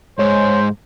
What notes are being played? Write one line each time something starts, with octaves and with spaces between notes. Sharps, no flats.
G#2 C5 C#5